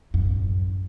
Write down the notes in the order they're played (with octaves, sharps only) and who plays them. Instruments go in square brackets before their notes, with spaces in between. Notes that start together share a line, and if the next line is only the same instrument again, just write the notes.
[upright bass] A1 F#2